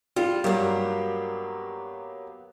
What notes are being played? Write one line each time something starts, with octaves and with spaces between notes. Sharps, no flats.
G3 F4
G2 F#3 A#3 B3 G4